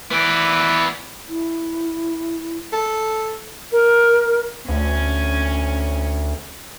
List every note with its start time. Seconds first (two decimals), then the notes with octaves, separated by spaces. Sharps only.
0.11 E3 B3 D5
1.29 E4
2.73 A4
3.72 A#4
4.69 D2 C#4